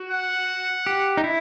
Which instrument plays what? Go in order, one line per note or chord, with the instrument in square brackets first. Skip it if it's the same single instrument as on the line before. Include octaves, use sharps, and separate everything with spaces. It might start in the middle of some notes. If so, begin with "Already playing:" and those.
Already playing: [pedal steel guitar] F#4
[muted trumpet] F#5
[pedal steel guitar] G4
D#4
E4